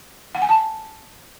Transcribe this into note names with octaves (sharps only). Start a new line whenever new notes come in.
F#5
G#5
A5